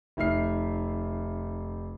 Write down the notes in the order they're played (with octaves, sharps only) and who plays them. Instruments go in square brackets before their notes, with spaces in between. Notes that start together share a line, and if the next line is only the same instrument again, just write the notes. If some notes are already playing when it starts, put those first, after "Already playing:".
[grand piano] F1 D#4 E5 F6 C7